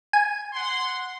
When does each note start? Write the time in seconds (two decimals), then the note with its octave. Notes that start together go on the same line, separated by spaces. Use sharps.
0.13 G#5
0.53 F#5 C6